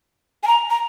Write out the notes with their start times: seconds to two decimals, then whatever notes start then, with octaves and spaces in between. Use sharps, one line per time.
0.43 G#5
0.47 A#5
0.70 A#5